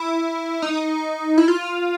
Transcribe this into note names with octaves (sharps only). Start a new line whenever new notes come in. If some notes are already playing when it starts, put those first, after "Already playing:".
Already playing: E4
D#4
E4
F4